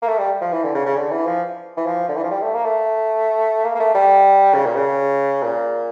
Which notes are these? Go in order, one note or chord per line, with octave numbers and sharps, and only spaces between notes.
A#3
A3
G3
F3
E3
D3
C#3
C#3
D3
E3
F3
E3
F3
D3
E3
F3
G3
A3
A#3
A3
A#3
A#3
A3
G3
C#3
A#2
C#3
A#2